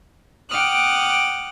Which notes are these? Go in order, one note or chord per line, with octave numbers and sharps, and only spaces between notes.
F#5 G5 D6 D#6 F6 F#6